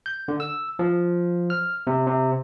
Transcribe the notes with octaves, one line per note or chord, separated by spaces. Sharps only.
G6
D3
E6
F3
F6
C3
C3